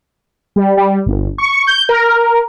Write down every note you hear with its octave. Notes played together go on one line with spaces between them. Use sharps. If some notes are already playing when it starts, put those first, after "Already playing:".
G3
G3
G1
C#6
G6
A#4